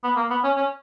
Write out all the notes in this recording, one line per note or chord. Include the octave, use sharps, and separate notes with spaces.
B3
A#3
B3
C#4
C#4